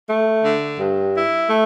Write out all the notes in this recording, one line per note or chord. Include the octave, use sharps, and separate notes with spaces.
A3
D3
G2
E4
A3